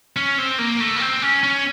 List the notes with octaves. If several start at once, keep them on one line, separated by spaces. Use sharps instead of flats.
C#4
C4
A#3
A3
A#3
C4
C#4
C#4